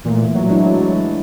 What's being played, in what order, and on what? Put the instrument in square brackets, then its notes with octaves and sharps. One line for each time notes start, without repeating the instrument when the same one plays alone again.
[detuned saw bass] A#2 [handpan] E3 A3
[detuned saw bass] F#3
[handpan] G#3 D4 E4